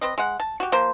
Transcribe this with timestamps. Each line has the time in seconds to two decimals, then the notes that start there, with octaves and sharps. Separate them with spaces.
0.01 C4 B4 D#5
0.18 G#3 F#5
0.40 A5
0.60 F#4 G4
0.72 F3 A#3 C5